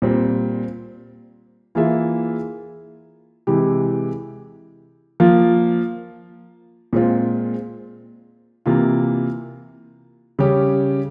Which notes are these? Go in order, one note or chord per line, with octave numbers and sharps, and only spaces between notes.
A#2 G3 C4
E3 A#3 F4 G#4 E5
C3 E3 G#3 E4 G4
F3 A#3 F4
A#2 G#3 C4 F4
C3 E3 A#3 F4
C#3 G3 C#4 G4